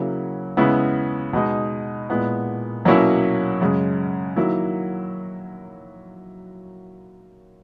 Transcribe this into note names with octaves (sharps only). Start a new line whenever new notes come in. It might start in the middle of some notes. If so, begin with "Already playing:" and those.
Already playing: C#3 F#3 A#3 E4
C#3 G#3 B3 E4
B2 G#3 D#4
A#2 G#3 B3 E4
B2 F#3 A#3 C#4 E4
F#2 C#3 G#3
D#3 F#3 A#3 E4